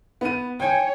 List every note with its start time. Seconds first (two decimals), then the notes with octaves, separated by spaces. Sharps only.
0.21 B3 D#7
0.60 C#5 G5 G#5